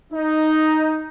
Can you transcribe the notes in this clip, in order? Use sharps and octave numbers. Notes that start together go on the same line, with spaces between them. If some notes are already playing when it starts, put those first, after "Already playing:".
D#4